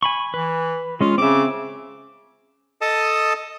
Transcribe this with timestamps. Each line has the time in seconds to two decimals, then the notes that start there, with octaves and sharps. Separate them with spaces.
0.03 G#5 B5 C#6
0.34 E3 B4
1.01 G#3 C#4 F4
1.18 C#3 C4 E5 D6
2.81 A4 D#5 A5 D#6